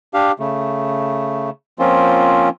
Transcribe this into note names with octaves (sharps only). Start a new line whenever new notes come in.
D4 G4 F5
C#3 A3
F3 A#3 C4 C#4 F4